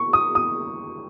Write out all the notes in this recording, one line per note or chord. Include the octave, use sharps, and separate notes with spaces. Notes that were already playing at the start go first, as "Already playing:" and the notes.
Already playing: C#6
D#6
D#6